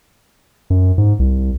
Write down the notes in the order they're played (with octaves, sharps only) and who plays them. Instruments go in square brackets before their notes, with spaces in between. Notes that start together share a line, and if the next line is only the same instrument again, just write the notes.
[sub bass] F#2
G#2
C2